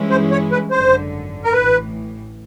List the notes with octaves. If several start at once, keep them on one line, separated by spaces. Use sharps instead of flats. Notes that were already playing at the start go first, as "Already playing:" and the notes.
Already playing: G2 E3 G#3 C#4 E4
C5
C#5
B4
G#1 F#2 D3 C5
A#4
A1 A2 E3 B4